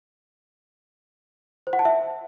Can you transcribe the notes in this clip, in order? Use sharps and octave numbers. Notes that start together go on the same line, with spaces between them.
C5
F#5
A5
E5